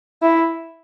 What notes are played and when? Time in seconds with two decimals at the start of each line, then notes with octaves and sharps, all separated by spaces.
0.22 E4